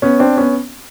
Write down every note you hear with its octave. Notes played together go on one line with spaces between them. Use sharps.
B3 C#4
C4 D4
B3 C#4